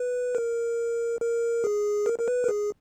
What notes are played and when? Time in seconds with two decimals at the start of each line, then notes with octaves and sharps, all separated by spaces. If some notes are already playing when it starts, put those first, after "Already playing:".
Already playing: B4
0.35 A#4
1.21 A#4
1.64 G#4
2.06 A#4
2.19 A#4
2.28 B4
2.44 A#4
2.49 G#4